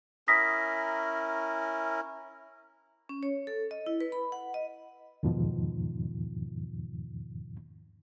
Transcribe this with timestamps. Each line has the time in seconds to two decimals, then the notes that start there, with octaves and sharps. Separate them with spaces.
0.28 C#4 E4 A#4 D#6 A#6 B6
3.09 C#4
3.23 C#5
3.47 A4
3.71 D#5
3.86 E4
4.01 B4
4.12 B5
4.32 F#5
4.54 D#5
5.23 E2 G#2 B2 D#3 F3